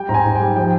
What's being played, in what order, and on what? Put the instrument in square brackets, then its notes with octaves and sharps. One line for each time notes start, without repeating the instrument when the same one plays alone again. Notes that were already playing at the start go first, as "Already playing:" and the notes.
Already playing: [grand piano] G3 G5
G#2 A#5
G#5
G#2
G5
G3
F3 G5